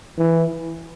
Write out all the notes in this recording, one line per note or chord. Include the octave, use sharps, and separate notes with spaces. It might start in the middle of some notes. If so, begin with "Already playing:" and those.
E3